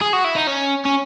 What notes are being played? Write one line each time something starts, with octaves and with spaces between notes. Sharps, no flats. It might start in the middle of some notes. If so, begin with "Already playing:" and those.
G#4
F#4
E4
D#4
C#4
C#4